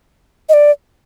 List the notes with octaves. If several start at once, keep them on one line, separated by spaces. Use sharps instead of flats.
D#5
D5